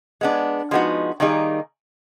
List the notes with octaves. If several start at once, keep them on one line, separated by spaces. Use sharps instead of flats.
G#3 B3 D4
F3 G#3 B3 D#4 F#4
D#3 G3 A#3 D#4 G#4